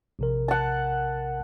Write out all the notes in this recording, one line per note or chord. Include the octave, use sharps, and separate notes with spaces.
A#1 C3 A#4
F#5 A5